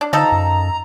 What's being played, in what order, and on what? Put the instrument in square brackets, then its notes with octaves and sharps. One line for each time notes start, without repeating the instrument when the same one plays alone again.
[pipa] D4
[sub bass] D3 [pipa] F3 D#4 A4 [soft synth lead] A#5
[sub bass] F#2